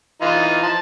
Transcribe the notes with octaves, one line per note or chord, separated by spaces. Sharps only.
E3 D#4 F4
F3 A5